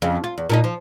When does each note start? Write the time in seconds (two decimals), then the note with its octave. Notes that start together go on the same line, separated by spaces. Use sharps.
0.02 F2 C#3
0.24 F4
0.38 E2
0.50 A#2 D4 D#4
0.64 F3